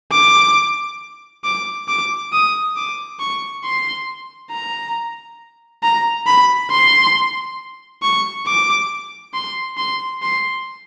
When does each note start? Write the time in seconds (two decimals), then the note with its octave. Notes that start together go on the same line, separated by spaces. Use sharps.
0.12 D6
1.44 D6
1.88 D6
2.33 D#6
2.76 D6
3.20 C#6
3.64 C6
4.52 A#5
5.83 A#5
6.27 B5
6.71 C6
8.03 C#6
8.46 D6
9.34 C6
9.77 C6
10.22 C6